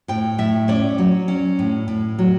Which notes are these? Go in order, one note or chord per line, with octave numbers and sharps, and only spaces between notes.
A2 G5
A2 E5
C#4 D5
F#3
C#4
A2
A2
F#3